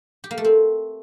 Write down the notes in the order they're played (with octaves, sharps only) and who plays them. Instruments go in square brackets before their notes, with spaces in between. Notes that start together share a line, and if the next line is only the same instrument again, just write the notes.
[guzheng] G4
A#3
A3
C4